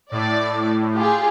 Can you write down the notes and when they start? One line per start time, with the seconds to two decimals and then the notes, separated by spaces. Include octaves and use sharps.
0.12 A2 D5
0.96 F4 G4 G#4